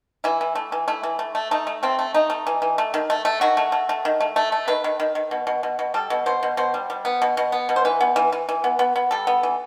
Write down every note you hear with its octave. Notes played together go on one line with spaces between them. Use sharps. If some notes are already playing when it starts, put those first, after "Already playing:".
E3 E4
E3
A3
E3
A3 E4
E3
A3
A3
A3 D#4
A3
A3 C4
A3
A3 D#4
A3
E3
E3
A3
D#3
A3
A3
D#3 F#4
A3
A3
A3
D#3
A3
A3
A3
D#3 B4
D#3
D#3
D#3
B2
B2
B2
B2
G3 A4
B2
B2 C5
B2
B2 C5
G3
G3
B3
B2
B2
B3
B2
C5
E3 B4
B3
E3
E3
E3
B3
B3
B3
G3 A4
B3
E3